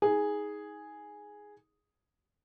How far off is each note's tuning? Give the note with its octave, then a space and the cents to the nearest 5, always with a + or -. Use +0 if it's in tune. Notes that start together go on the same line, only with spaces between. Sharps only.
D#4 +30 G#4 +0